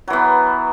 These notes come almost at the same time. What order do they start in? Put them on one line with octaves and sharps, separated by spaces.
F#3 E3 B3